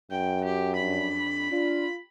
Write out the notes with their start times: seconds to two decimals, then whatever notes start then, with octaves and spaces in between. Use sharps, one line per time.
0.11 F#2 G5
0.45 G4
0.76 F2 D4 B5
1.51 D4 F4